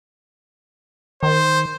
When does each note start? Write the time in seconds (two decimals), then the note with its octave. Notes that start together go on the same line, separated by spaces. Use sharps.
1.23 D#3 C5